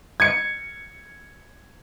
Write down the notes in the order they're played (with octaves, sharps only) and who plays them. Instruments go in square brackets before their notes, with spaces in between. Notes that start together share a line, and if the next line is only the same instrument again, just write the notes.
[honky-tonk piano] G#6 C#7